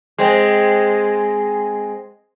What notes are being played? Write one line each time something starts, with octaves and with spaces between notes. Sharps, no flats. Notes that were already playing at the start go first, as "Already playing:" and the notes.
G#3 C4